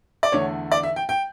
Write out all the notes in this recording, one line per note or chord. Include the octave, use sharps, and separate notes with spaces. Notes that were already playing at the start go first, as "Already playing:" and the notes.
D5
E2 D3 A3 C#5
D5
E5
G5
G5